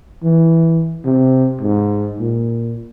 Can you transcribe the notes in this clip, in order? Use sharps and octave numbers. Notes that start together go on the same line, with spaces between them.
E3
C3
G#2
A#2